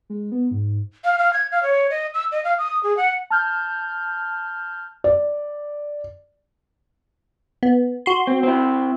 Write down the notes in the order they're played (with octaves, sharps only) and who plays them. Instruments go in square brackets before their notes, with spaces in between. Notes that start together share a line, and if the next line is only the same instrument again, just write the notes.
[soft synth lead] G#3
B3
G#2
[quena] F5
F5
G#6
F5
C#5
D#5
E6
D#5
F5
D#6
G#4
F#5
[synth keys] A5 F6 G6
[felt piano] D5
[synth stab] B3
F#4 C6
[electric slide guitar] C4
C4 E4